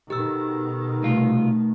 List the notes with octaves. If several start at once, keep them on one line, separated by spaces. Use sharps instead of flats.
B2 D#3 G4 A4 E6
C2 A3 F4